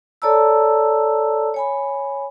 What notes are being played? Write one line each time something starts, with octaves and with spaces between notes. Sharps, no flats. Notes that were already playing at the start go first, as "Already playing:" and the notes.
A4 C#5 D5 A5 A#5 E6
C#5 G#5 B5